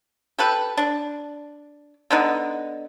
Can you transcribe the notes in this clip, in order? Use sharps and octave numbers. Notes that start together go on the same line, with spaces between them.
G4 A4 B4
D4
D3 B3 D#4